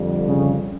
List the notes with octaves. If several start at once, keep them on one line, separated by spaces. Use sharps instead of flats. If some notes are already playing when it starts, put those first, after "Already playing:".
Already playing: F2 D3 G3
C#3